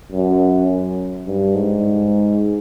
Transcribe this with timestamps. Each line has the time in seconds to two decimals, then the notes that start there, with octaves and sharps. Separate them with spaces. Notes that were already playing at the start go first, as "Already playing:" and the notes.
0.12 F#2
1.27 G2
1.55 G#2